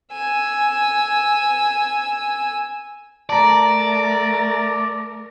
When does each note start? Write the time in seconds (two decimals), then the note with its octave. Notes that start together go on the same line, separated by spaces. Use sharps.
0.12 G#5 E6
3.29 A3 A#4 D5 A5 A#5